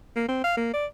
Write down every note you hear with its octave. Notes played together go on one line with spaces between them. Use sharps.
A#3
C4
F5
A#3
D5